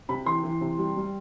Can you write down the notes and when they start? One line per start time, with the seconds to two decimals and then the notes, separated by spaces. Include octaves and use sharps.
0.09 C3 B5
0.26 E3 C6
0.43 E3
0.61 C3
0.78 G3
0.97 G3